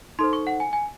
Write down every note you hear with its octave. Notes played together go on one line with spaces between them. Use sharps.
D#4 A4 C5 C6
C#6
F#5
G#5
G#5